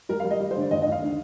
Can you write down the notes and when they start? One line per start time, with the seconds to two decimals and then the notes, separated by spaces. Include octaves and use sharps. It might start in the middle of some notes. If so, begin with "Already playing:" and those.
0.09 G3 A#4
0.20 F5
0.25 G3
0.31 D#5
0.40 G3
0.51 C5
0.56 D3 D5
0.71 D#2 D#5
0.82 D#5
0.87 D#2
0.92 F5
1.02 D3